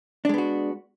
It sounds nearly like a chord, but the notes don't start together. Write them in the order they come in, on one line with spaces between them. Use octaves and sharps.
D4 G#3 B3 F#4